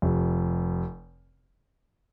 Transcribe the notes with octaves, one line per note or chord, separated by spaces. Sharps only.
F1 F2 C3